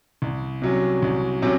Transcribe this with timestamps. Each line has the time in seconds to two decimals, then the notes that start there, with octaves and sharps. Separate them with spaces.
0.22 C2
0.62 C3 F#3 C#4
1.02 C2
1.42 C3 F#3 C#4